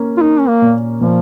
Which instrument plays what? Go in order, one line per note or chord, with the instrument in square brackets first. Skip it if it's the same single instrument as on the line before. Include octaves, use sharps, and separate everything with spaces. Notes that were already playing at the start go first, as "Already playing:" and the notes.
Already playing: [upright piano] A#3 C#4
[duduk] F4
[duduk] D#4 [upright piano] A#4
[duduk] C#4
A#3
[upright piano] A#2
[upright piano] A#2 [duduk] F3